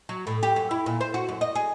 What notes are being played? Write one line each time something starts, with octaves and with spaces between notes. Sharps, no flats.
F#3
A2
G4
F#2
E4
A#2
C5
F#4
F#2
D#5
G#4